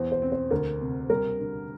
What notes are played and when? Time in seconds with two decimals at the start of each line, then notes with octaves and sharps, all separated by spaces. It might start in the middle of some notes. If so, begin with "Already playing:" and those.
Already playing: E2 C5
0.12 C5
0.22 C4
0.32 C5
0.51 D2 A#4
0.81 C3
1.10 G3 A#4
1.39 D3